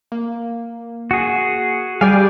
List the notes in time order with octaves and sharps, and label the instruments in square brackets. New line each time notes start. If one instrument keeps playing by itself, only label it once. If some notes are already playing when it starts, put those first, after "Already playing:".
[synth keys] A#3
[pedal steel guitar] F#4 G#4
[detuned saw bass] G3 [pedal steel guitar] G4 D5 F5 [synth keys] G#4 G#5